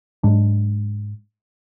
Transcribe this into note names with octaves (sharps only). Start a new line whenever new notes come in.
G#2 F#3 G#3 D4